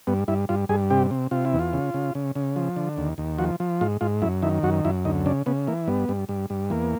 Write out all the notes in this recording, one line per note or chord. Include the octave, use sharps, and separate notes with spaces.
G2 B3
G2 E4
G2 F4
G2 G#4
C3 G4
C3
C3 F4
E4
E2
F4
C#3
C#3
C#3
C#3
F3
D3
D#2
D#2
F3 F#4
F3
G#2 F4
G#2 F4
F#2 E4
D#3 E4
F#2 F#4
F#2 E4
D2 D#4
C#3 D4
C#3 B3
E3 A#3
G2 B3
G2
G2
G2
E2 A#3